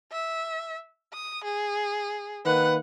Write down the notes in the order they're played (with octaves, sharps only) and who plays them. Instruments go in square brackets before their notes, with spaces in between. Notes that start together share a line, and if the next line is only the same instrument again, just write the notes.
[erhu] E5
D#6
G#4
[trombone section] D#3 A#3 B4 [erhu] F#5